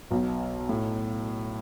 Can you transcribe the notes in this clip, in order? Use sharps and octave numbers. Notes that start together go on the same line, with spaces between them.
B1 B2
A2